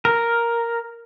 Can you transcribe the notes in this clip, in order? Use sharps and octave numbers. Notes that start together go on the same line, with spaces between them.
A#4